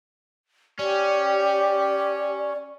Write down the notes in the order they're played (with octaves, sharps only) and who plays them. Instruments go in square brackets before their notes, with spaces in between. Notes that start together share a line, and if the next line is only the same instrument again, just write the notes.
[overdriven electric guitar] C#4 [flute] G4 [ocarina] D5